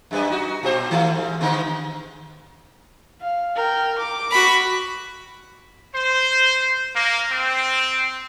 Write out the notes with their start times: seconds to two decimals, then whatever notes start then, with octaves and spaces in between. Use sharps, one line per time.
0.11 F#2 G3 B4
0.30 D#4 F#4
0.63 A#2 G4 C5
0.91 D#3 A3
1.15 G#2
1.41 D3 G#3 B3
3.21 F5
3.56 A#4 G5
3.98 D6
4.32 F#4 B5
5.95 C5
6.95 A#3
7.32 C4